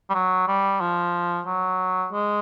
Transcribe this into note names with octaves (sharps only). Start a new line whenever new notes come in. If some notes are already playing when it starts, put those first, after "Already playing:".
G3
F#3
G3
F3
F#3
G#3